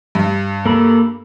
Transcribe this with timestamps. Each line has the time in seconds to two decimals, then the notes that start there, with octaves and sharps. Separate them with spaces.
0.15 G2
0.66 A#3 A4 B5